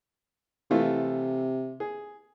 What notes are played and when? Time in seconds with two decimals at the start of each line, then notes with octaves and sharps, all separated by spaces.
0.71 C3 E3 A3 F4
1.80 G#4